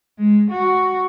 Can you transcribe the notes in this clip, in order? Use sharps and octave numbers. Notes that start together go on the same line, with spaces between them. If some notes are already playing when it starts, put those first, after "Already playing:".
G#3
F#4